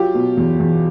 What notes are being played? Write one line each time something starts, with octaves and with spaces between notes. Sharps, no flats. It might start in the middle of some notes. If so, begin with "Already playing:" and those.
Already playing: F#3 F4 G4
B2
E2
E2